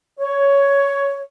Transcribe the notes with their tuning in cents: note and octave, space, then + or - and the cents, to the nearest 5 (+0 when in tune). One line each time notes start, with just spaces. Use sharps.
C#5 +10